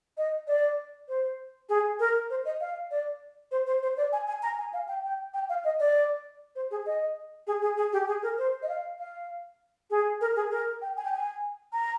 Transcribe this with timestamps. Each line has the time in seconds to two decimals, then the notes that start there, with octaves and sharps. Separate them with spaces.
0.17 D#5
0.47 D5
1.08 C5
1.69 G#4
2.00 A#4
2.30 C5
2.45 D#5
2.60 F5
2.91 D5
3.51 C5
3.67 C5
3.83 C5
3.97 D5
4.13 G#5
4.28 G#5
4.43 A#5
4.58 G#5
4.73 F5
4.88 G5
5.04 G5
5.34 G5
5.49 F5
5.64 D#5
5.80 D5
6.56 C5
6.71 G#4
6.86 D#5
7.47 G#4
7.62 G#4
7.77 G#4
7.93 G4
8.08 G#4
8.23 A#4
8.38 C5
8.63 D#5
8.69 F5
8.99 F5
9.90 G#4
10.21 A#4
10.36 G#4
10.51 A#4
10.82 G5
10.97 G#5
11.05 G5
11.12 G#5
11.73 A#5